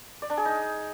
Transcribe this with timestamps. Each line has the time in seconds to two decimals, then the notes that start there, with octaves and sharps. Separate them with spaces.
0.22 D5
0.30 D4
0.38 G#4
0.45 D#4